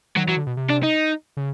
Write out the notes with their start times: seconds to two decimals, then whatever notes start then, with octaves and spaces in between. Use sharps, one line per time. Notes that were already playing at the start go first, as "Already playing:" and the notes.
0.16 D#3 F#3
0.27 E3 F#3
0.37 D3
0.47 B2
0.57 C3
0.70 D4
0.83 D#4
1.37 C#3